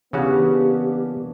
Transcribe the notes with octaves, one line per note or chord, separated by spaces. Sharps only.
C#3 E3 A#3 B3 C#4 D4 F#4 G4